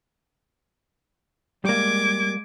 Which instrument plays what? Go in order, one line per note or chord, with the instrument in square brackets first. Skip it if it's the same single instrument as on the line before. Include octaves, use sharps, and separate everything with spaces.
[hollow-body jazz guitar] G3 A#3 [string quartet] G#3 D6 G#6